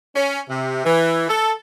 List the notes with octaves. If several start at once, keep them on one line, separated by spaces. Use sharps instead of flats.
C#4
C3
E3
A4